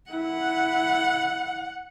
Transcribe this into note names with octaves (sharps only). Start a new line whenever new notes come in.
E4 F#5